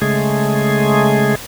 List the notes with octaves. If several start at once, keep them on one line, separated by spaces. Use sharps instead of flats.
C#3 G#3 A3 G#4